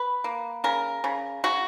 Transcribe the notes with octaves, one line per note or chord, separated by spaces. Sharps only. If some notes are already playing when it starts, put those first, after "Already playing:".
Already playing: B4
A#3
C#3 A#4
C#3
C#3 F#4